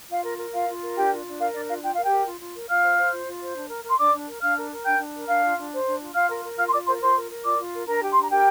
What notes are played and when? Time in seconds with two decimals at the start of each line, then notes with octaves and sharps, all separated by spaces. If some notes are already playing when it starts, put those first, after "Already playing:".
0.09 F4 F5
0.25 A#4
0.38 A#4
0.53 F4 F5
0.67 F4
0.82 A#4
0.96 D4 G4 G5
1.11 F4
1.26 D4
1.39 A#4 F5
1.54 D4 D5
1.68 F4 F5
1.82 F4 G5
1.93 A#4 F5
2.04 G4 G5
2.12 A#4
2.25 F4
2.40 F4
2.55 A#4
2.69 F4 F5 F6
2.83 C5
2.97 C5
3.12 F4
3.27 F4
3.42 C5
3.55 D4
3.69 A#4
3.84 A#4
3.90 C6
3.98 D4 D5 D6
4.13 D4
4.27 A#4
4.41 D4 F5 F6
4.57 A#4
4.71 A#4
4.85 D4 G5 G6
4.99 D4
5.14 A#4
5.28 D4 F5 F6
5.43 F4
5.56 D4
5.72 C5
5.86 D4
6.00 F4
6.14 F4 F5 F6
6.29 A#4
6.43 A#4
6.58 F4 F5 F6
6.68 C6
6.72 F4 D5 D6
6.86 A#4 C5 C6
7.01 F4 C5 C6
7.15 A#4
7.30 A#4
7.44 F4 D5 D6
7.59 F4
7.74 A#4
7.87 D4 A#4 A#5
8.02 G4
8.12 C6
8.17 D4 A#5
8.30 G4 A#4 G5